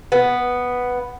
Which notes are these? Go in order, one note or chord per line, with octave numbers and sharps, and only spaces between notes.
B3